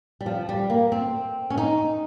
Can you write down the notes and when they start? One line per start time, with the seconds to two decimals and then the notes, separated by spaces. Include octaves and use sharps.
0.21 G3
0.26 F3
0.49 G3
0.70 A#3
0.92 C4
1.50 C#4
1.58 D#4